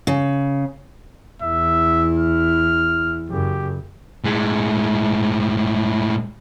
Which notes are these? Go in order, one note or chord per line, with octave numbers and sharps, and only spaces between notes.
C#3
E2 E4 E5
F6
F#2 C#3 G4
A2 G#3